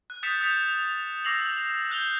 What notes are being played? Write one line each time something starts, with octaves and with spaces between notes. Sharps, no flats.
F#6
D#6 G6 A6 B6 C#7 E7
D#6 G6 A6 B6 C#7 F7
D6 E6 A#6 C7 F7 F#7
F#6 G6 F7 G7